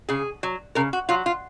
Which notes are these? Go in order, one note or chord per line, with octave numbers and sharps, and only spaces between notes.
C#3 G#4
F#3
C#3 A#4
F#4
F#3 F4
F4